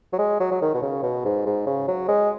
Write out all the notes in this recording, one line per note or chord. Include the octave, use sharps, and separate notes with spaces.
F#3
G#3
F#3
F#3
D#3
B2
C#3
B2
G#2
G#2
C#3
F#3
G#3